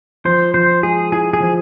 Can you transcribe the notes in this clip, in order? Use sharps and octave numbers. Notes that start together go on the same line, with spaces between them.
F3 C5
F3 C5
G#3 G#4
E4 G#4
G#4
F3